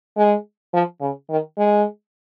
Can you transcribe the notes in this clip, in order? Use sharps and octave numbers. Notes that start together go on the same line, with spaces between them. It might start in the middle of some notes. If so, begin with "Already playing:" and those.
G#3
F3
C#3
D#3
G#3